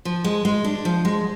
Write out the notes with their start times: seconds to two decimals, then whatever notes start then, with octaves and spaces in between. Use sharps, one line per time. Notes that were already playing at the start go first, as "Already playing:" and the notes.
0.05 F3
0.24 G#3
0.45 G#3
0.65 D4
0.85 F3
1.05 G#3